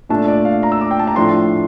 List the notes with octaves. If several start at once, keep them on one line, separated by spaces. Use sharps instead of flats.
A#2 A3 D4 A5
D5
F5
A#5
E6
D6
G5
A5
A#5
A2 F3 A3 D4 C6